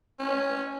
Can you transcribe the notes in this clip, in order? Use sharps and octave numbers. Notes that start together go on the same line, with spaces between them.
C#4